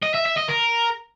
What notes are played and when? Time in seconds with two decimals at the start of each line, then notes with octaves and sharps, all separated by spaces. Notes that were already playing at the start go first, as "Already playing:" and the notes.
0.03 D#5
0.14 E5
0.26 E5
0.38 D#5
0.49 A#4